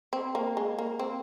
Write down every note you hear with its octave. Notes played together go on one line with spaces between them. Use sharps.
C4
A#3
G#3
A#3
C4